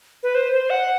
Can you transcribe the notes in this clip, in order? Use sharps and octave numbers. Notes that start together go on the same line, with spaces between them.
B4
C5
C5
F#5